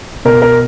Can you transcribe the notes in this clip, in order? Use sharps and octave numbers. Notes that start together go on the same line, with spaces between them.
B2 A#4
A#4